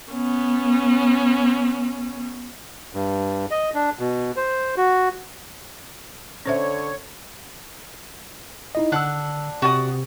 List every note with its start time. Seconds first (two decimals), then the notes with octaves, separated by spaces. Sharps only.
0.13 B3 C#4
2.93 G2
3.51 D#5
3.75 D4
3.99 B2
4.37 C5
4.77 F#4
6.46 D3 C#4 C5 C#5 E5
8.75 D#4 E4 D#5
8.92 D3 D4 F#5 E6 F6
9.62 C3 F#4 D5 D#6